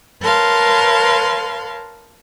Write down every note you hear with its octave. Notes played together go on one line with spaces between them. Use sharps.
A#4 B4 C#5 F5 A5 C6